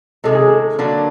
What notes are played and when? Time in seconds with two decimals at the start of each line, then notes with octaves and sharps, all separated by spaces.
0.24 C3 D#3 G#3 A4
0.35 G#4
0.47 A4
0.79 D3 F#3 A#3 D4